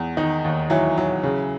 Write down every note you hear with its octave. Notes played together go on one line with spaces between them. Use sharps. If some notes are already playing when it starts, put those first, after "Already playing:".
Already playing: E2
D#3 D#4
D#2
E3 F#3 E4
F#3
C#3